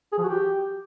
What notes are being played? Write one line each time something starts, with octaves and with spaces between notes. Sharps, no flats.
G#4
F3
F#4
G4